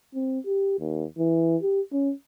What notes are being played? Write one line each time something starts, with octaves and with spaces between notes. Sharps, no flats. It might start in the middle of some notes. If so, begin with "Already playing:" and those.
C4
G4
D#2
E3
G4
C#4